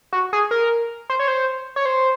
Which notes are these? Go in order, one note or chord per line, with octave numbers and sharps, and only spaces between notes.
F#4
G#4
A#4
C5
C#5
C5
C#5
C5